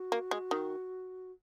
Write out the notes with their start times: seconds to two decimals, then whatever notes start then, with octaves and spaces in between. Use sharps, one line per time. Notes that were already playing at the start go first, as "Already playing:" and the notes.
Already playing: F#4
0.12 A#3
0.31 G#3
0.51 D#3